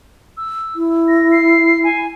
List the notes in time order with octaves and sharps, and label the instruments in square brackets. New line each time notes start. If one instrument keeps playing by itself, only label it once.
[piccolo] E6
[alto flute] E4
[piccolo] A#6
C7
G#5